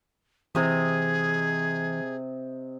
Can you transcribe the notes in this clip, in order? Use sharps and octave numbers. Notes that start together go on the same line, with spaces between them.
C3 E3 G#4 D#5